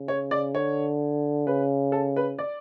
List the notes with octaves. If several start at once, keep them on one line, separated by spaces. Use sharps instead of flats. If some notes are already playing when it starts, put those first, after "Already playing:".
Already playing: C#3
C#5
D5
D3 C#5
C#3 B4
A4
B4
D5